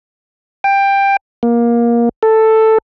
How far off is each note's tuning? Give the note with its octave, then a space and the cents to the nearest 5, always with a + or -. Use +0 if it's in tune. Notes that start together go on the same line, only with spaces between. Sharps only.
G5 +15
A#3 +20
A4 +5